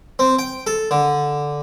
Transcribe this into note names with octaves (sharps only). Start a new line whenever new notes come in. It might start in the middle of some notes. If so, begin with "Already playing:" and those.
C4
G5
A4
D3